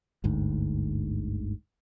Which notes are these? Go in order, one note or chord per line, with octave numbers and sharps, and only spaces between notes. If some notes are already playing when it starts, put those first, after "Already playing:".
G1 D2 G#2